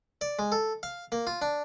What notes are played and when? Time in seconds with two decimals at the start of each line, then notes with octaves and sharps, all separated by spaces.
0.21 D5
0.39 G#3
0.52 A4
0.83 F5
1.12 A#3
1.27 F4
1.42 D4